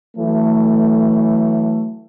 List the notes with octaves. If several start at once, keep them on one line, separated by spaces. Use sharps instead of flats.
E3 F#3 A3